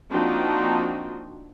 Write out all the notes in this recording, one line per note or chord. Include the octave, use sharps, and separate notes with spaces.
F3 A#3 C4 D4 D#4 F#4